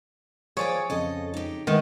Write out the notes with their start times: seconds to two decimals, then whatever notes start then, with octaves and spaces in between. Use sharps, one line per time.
0.57 F3 G#4 C#5 D5 G5 G#5
0.90 F2 C#3 A4 D#5
1.34 D#4 G4
1.67 D#3 G#3 A3 B3